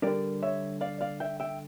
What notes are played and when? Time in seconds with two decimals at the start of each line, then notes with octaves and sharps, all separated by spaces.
0.02 D3 G3 D4 A#4 D5
0.43 C#5 E5
0.81 D5 F5
1.01 D5 F5
1.20 E5 G5
1.40 E5 G5